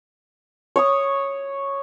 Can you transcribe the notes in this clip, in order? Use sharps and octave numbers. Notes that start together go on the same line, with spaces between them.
C#5 C#6 D#6